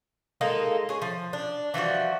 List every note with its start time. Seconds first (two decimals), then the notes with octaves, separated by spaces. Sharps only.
0.41 G#3 A#3 D#4 A4
0.89 G#4 C#5
1.02 F3
1.33 D4
1.74 E3 F3 G3 F#4